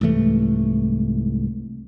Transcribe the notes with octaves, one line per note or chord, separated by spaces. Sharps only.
C2 G#2 E3 A3